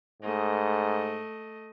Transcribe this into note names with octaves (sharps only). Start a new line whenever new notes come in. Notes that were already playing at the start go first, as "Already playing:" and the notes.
G#2 A3 D#5